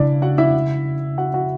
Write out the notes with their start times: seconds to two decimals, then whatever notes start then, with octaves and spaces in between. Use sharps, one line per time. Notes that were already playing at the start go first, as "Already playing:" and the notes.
Already playing: C#3 D4 E4 D5
0.22 F#4 F#5
0.38 E4 E5
1.18 F#4 F#5
1.34 F#4 F#5